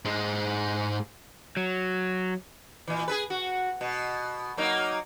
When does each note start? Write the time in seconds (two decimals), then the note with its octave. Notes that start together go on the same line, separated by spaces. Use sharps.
0.05 G#2 G#3
1.57 F#3
2.88 A#2 E3
3.08 G#4 A4 B4
3.30 F#4
3.81 B2
4.57 F#3 A#3 D#4